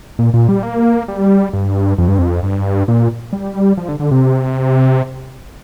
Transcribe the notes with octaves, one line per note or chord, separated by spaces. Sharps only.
A#2
A#2
G3
A#3
G3
G2
F2
G2
F2
G2
A#2
G3
F3
D3
D3
C3